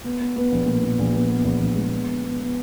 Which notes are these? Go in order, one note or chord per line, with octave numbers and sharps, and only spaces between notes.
B3
B3
B3
A#1
A#2
A#2
A#1
B3
B3
A#1
A#1
G#3
B3
B3
B3
B3